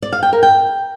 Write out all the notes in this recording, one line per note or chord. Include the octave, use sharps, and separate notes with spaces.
D5
F5
G5
A#4
G5